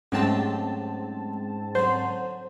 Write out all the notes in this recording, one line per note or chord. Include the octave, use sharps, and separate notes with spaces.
G#2 F#3 A3 C4 C#4 G4 A5
D3 F#3 C5